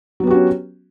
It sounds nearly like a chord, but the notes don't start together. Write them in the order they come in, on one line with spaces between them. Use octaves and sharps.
F#3 B3 G4 F#4 C#4